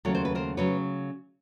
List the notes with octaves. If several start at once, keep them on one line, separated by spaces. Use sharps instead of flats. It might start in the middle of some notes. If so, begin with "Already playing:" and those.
D#2 C#3 F#3 A3 C#5
C5
B4
A#4 C5
C#3 F#3 B4 C#5